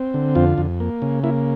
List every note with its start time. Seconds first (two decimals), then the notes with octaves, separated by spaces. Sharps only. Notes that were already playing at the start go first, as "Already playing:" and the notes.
Already playing: C4
0.14 D3
0.35 F2 F4
0.58 F2
0.80 A#3
1.02 C#3
1.23 A#3 E4